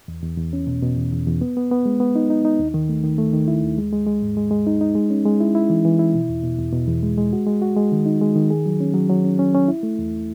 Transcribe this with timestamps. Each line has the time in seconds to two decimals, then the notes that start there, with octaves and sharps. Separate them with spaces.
0.08 E2
0.22 E2
0.38 E2
0.53 C#4
0.67 B2
0.83 B2
0.97 E2
1.12 E2
1.27 E2
1.41 B3
1.57 B3
1.71 B3
1.85 G#3
2.00 B3
2.16 D#4
2.30 D#4
2.45 D#4
2.59 D#2
2.74 D#3
2.89 A3
3.04 D#3
3.18 A3
3.33 D#3
3.48 E4
3.63 D#2
3.78 G#3
3.93 G#3
4.07 G#3
4.22 G#2
4.37 G#3
4.51 G#3
4.67 D#4
4.81 D#4
4.95 G#3
5.10 C#4
5.25 G#3
5.40 E4
5.55 E4
5.70 E3
5.85 E3
5.99 E4
6.14 B2
6.29 E2
6.44 B2
6.58 E2
6.73 B2
6.87 E2
7.03 G#3
7.18 G#3
7.33 F#4
7.46 G#3
7.62 F#4
7.76 G#3
7.92 D#3
8.06 D#4
8.21 G#3
8.36 D#3
8.50 G#4
8.66 F#3
8.80 C#4
8.94 F#3
9.09 F#3
9.24 C#4
9.39 C#4
9.54 C#4
9.68 E4
9.83 A3
9.99 E2